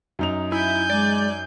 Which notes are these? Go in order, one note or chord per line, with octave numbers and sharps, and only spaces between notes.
F#2 D#4 F7
E4 G#5 G6
G#3 D5